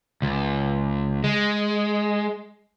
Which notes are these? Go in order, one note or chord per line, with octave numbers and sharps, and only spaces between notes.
C#2
G#3